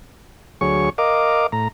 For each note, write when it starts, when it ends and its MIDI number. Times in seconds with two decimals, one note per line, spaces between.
0.61 0.90 38
0.61 0.90 54
0.61 0.90 68
0.61 0.90 73
0.61 0.90 85
0.98 1.47 70
0.98 1.47 75
0.98 1.47 77
0.98 1.47 86
1.52 1.68 45
1.52 1.68 82